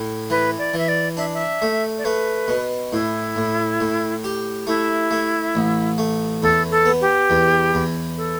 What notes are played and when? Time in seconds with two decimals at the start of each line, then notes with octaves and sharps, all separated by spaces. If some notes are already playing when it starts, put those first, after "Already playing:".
Already playing: A2
0.30 E3 B4
0.59 D5
0.74 E3 E5
0.89 D5
1.17 D4 E5
1.34 E5
1.62 A3
1.98 D5
2.05 A3 B4
2.48 B2
2.92 A2 E4
3.36 A2
3.81 A2
4.24 G4
4.67 A3 E4
5.11 A3
5.55 A1
5.98 A3
6.42 E2 A4
6.71 A4
6.85 B3
7.01 G4
7.30 E2
7.74 E2
8.17 A4